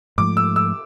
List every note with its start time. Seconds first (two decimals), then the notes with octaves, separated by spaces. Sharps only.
0.18 G#2 F3 A3 D6
0.37 E6
0.56 E6